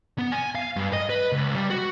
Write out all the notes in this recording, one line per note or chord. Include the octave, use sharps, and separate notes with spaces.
B3
G#5
F5
G2
D#5
B4
C#2
G3
F#4